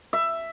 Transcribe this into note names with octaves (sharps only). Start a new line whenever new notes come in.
E5